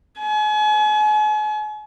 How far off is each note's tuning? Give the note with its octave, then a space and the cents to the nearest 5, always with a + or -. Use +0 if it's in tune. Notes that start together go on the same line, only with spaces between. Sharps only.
G#5 +40